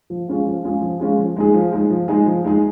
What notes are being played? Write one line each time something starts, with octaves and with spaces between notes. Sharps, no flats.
F3
G#3 C#4 F4 G#4
F3
G#3 C#4 F4 G#4
F3
G#3 C#4 F4 G#4
F3
G#3 D#4 G#4
F3
G#3 D#4 G#4
F3
G#3 D#4 G#4
F3
G#3 D#4 G#4